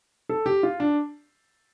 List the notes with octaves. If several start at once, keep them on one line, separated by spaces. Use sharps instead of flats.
A4
G4
F4
D4